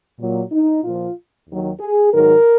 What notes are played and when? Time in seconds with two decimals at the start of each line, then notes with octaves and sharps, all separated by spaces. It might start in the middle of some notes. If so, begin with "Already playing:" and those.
0.20 A#2 F#3
0.52 D#4
0.84 A#2 F3 F4
1.49 D#2 D#3 F#3
1.80 G#4
2.13 G#2 D#3 F#3 A#4